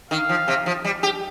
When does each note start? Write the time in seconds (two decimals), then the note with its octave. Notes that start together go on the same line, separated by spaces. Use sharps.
0.11 D#3 F5
0.29 F3
0.48 C3
0.66 F3
0.84 G3
1.03 G4